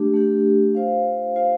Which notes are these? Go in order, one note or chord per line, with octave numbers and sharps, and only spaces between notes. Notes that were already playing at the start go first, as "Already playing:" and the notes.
Already playing: A3 D4 G4
A3 D4 G4
F4 C5 F5
F4 C5 F5